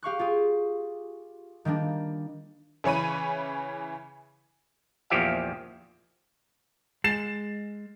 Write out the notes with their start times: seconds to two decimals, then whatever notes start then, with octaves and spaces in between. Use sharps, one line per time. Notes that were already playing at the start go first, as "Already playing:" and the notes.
0.03 G4 F5 C#6 F#6
0.19 F4 G4 G#4
1.65 D#3 G3 A#3 D4
2.84 C#3 E3 C#5 B5 D#7
5.10 A#1 E2 F3 G4 E5 F5
7.04 G#3 A6 C7 E7